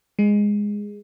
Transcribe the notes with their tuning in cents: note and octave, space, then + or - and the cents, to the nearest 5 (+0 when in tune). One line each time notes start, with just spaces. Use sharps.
G#3 -10